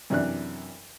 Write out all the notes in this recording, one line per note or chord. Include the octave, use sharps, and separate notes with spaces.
F#2 C3 E3 D4 F#6